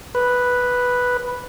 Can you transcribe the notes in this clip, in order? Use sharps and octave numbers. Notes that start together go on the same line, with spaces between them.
B4